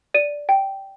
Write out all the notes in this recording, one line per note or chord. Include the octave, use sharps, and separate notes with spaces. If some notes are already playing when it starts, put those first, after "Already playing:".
D5 D#7
G5